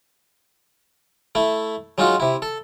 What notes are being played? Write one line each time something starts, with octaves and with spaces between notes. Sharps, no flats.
A3 E4
F#3 G#3 D#4 F4 F#4
C3 E4
A4